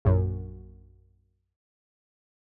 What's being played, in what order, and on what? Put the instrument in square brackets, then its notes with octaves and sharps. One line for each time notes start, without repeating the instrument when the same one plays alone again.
[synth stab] A#1 F#2